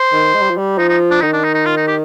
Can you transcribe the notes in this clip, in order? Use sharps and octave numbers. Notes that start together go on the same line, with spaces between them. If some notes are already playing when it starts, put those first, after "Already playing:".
Already playing: C5
D#3
G#3
G3
F3
G3
F3 D#4
D#4
D4
D#3 D#4
D4
D#4
D#4
F4
D#4
G4